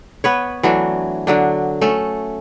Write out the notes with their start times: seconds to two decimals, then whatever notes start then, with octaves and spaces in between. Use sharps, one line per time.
0.24 B3 B4 C#5
0.63 E3 F#3 A3 D4
1.27 D3 F#3 D4
1.81 A3 C#4 A4